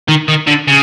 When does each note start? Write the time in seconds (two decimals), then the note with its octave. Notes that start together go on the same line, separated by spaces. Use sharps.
0.08 D#3
0.28 D#3
0.47 D3
0.68 C#3